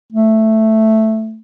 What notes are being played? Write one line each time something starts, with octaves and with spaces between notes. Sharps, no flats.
A3